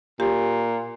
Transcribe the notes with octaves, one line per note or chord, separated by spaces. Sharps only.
A#2 G4